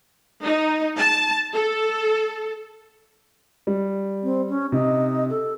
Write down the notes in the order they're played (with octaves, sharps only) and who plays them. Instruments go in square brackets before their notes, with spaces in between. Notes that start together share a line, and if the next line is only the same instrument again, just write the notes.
[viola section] D#4
A5
A4
[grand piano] G3
[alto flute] C4
C#4
[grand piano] C3 [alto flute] D#4
[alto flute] A4